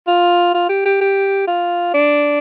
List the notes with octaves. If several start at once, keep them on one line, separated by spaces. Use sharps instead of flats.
F4
F4
G4
G4
G4
F4
D4